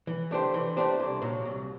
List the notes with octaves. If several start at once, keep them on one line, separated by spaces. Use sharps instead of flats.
E3
A3 D4 G4 C5
E3
A3 D4 G4 C5
C2
A#2 F#3
C2